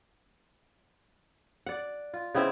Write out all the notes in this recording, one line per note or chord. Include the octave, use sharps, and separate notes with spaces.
D5 F#5
F4
C#3 B3 C4 E4